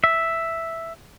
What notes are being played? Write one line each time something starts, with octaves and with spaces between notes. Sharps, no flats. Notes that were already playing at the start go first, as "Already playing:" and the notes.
E5